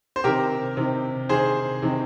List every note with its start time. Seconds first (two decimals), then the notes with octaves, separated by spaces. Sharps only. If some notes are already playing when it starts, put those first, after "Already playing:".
0.16 C5
0.24 C3 D#3 G4 A#4
0.77 C3 D#3
1.29 C3 D#3 G#4 C5
1.82 C3 D#3